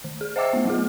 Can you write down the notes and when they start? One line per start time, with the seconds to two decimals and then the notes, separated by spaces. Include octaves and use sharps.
0.04 D#3
0.21 G#4
0.36 C5 D#5 E5 G5 D6 E6
0.53 A3 B3
0.65 F#3 A3 B3 F4 G#4